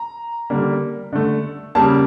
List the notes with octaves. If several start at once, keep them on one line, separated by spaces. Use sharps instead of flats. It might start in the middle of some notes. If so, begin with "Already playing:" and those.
Already playing: A#5
D3 G3 A#3
D3 A3
C#3 G3 A#3 A5